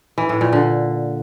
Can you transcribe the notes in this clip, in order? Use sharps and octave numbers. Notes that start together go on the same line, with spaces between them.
E3
A2
A#2
D3